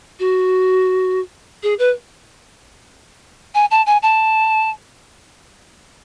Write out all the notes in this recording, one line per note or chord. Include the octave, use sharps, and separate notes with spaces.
F#4
G#4
B4
G#5
A5
G#5
A5